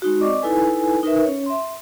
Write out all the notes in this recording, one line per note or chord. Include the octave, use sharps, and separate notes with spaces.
G#3 D#4 F#4
C4 D5 D#5 C#6 D6
D#4 E4 A4 B4 G#5
D#4 A#4 B4 E5
C#4 C#5
E5 C6